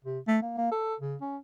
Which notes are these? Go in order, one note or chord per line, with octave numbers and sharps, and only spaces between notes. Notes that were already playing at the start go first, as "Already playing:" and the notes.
C3
A3
A#3
A#3
A4
C#3
C#4